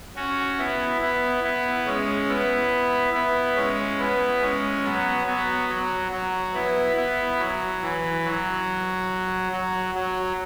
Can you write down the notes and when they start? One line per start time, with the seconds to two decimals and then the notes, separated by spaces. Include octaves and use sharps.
0.16 C#4 F#4
0.58 B3 E4
1.01 B3 E4
1.43 B3 E4
1.86 G#3 C#4
2.28 B3 E4
3.13 B3 E4
3.56 G#3 C#4
3.99 B3 E4
4.41 G#3 C#4
4.83 F#3 B3
5.26 F#3 B3
5.69 F#3
6.11 F#3
6.54 B3 E4
6.96 B3 E4
7.39 F#3
7.82 E3
8.24 F#3
9.52 F#3
9.94 F#3